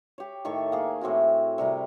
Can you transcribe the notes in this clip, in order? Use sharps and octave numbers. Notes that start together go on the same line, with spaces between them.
G4 C#5
A2 D#3 A4 C#6
A#3 G#4
A2 C4 E4 F#4
C3 G3 A#4